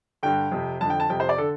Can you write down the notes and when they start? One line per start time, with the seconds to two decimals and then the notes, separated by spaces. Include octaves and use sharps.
0.23 G2 D3 G5
0.52 F2 C3
0.81 F2 D3 A5
0.90 G5
1.00 A5
1.10 F2 C3 G5
1.20 C5
1.29 D5
1.38 D3 A4